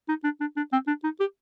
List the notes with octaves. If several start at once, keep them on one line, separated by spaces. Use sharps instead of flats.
D#4
D4
D4
D4
C4
D4
D#4
G4